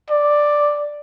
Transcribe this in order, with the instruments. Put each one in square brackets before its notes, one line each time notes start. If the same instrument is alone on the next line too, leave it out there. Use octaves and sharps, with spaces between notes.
[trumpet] D5